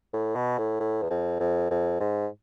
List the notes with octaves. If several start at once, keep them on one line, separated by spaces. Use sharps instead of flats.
A2
B2
A2
A2
E2
F2
F2
F2
G#2